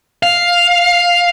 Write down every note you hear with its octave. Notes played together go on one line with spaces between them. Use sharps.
F5